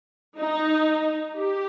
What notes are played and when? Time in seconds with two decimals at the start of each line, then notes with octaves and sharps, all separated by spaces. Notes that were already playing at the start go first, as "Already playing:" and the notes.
0.38 D#4
1.36 G4